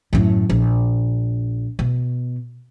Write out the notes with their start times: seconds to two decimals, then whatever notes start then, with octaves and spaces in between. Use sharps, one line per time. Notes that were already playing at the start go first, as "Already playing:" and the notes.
0.13 F#2 A2
0.50 A#1
1.79 B2